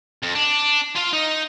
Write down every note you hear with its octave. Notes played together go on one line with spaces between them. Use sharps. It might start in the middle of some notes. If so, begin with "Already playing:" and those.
F2
D4
F4 F5
D#4